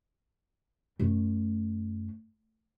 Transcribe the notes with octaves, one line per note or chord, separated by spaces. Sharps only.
F#2 A3